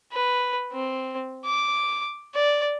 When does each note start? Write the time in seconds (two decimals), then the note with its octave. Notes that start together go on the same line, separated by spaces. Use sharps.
0.13 B4
0.73 C4
1.45 D6
2.35 D5